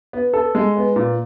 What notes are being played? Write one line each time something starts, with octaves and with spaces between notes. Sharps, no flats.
B3
A4
G#3
B3
A#2